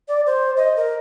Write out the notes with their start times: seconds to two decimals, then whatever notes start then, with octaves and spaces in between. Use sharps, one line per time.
0.08 D5
0.26 C5
0.56 D#5
0.76 A#4